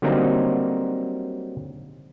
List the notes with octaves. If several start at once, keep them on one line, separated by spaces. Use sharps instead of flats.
D3 F#3 G3 A#3 C4 D#4